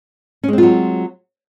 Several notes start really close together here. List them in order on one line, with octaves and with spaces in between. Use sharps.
C#4 G#3 C4 F4 F#3